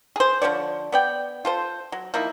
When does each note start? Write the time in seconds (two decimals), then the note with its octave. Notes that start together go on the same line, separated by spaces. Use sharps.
0.16 G#4 C5
0.42 D3 F3 C#5 D5
0.92 B3 D5 G5
1.45 F4 A4 C5
1.92 F#3
2.14 F3 A#3 D#4 E4